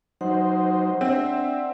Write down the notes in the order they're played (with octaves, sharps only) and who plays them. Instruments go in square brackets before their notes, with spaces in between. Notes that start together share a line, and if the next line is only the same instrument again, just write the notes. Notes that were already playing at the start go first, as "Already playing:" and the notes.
[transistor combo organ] F#3 D#4 C5 [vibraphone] F#5
[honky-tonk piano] C4 [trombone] D4 [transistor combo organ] E5